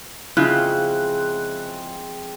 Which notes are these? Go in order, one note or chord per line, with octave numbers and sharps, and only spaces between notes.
C#3 F3 G#3 C4 E4 F4 F5 F#6